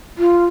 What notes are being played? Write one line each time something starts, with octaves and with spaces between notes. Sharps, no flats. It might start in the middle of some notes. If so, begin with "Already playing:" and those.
F4